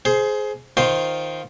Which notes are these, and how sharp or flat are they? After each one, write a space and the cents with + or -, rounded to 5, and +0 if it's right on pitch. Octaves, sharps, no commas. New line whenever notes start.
G#4 +20 C5 +0
D#3 +0 F4 +0 C5 +0